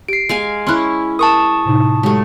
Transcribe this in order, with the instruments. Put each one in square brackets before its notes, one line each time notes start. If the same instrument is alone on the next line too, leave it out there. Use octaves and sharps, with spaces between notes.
[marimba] G4 [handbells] C7 D7
[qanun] G#3 F5 G#5
[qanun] C#4 E4 [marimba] C6 F6 F#6
[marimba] A#4 [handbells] A5 C#6 D#6
[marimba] A2 C3 D#4
[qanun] F#3 A3 [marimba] G#3 G4